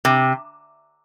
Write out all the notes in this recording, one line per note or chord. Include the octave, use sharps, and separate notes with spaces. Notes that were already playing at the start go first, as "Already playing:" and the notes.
C3